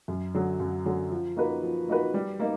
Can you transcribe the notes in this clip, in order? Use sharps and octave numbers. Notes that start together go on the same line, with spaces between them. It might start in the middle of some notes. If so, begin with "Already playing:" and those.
F#2
D3 F#3
F#2
D3 F#3
F3
A#3 D#4 F#4 B4
F3
A#3 D#4 F#4 B4
G3
A#3 D#4